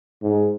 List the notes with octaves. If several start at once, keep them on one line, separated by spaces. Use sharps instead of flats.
G#2